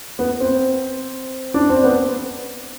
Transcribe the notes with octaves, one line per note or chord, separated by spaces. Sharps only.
B3
C4
D4
C4
B3